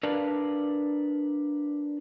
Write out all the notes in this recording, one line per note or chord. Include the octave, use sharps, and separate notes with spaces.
D4 A#4 B4 D5 F5 A5